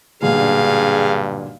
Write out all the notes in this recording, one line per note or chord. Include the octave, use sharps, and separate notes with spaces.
B1 G2 A#2 D3 G#4 F5